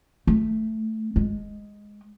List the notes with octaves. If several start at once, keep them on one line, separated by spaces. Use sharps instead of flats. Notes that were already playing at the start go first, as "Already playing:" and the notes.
A3
G#3